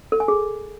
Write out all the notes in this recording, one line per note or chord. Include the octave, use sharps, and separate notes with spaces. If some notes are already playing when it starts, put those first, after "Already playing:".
A4
G#5
G#4